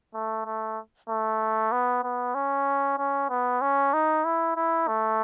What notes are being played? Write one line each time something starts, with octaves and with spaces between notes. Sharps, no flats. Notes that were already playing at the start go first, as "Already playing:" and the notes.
A3
A3
A3
B3
B3
C#4
C#4
B3
C#4
D#4
E4
E4
A3